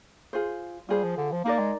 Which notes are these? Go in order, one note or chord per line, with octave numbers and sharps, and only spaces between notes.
F4 G#4 C5
G3 F4 G#4 C5
F3
D3
F3
A#3 D#4 A#4 D5
G#3